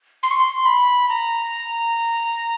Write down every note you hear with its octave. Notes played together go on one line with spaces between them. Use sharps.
C6
C#6
C6
B5
A#5